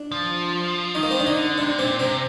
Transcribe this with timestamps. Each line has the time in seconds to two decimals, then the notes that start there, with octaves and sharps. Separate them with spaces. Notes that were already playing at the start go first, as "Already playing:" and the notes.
Already playing: D4
0.12 F3
0.95 D#3 D#4
1.03 A#3
1.11 C4
1.20 D4
1.27 D3 D#4
1.58 C3 D4
1.79 A#2 C4
1.99 C3 C4